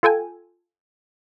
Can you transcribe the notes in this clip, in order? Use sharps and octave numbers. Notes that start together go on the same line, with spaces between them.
F4 A4 G5 G#5